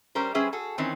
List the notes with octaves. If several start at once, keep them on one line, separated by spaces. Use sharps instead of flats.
G3 C#4 A#4 C5
G3 C#4 G#4 B4 C5 E5
F#4 G#4 A4
D#3 E3 C4 C#4